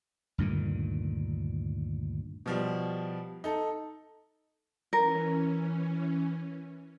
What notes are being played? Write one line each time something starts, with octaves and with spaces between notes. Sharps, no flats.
D2 G2 A#2 D#3
B2 F3 G3
D#4 A4
E3 C#4 A#4